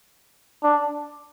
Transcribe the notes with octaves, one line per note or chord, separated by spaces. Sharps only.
D4